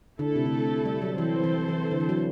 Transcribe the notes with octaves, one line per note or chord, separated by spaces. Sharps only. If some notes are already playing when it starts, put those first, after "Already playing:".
D3 A3 E4 A4
C3
D3
C3
G3
F#3
E3 C4 E4 A4 C5
E3
E3
D3
E3
F#3